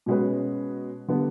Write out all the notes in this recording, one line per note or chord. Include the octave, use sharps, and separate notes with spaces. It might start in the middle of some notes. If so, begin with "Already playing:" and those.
B2 G#3 C#4 F#4 B4
D3 G3 B3